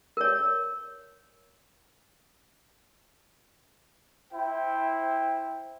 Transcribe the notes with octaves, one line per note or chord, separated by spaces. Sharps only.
A#4 C#5
E4 C5 G5